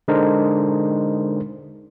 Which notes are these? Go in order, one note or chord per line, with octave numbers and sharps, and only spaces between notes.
D3 G#3 D4 D#4 A#4 C5